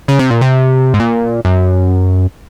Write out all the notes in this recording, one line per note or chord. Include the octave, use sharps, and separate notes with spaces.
C#3
C3
A#2
C3
G#2
A#2
F#2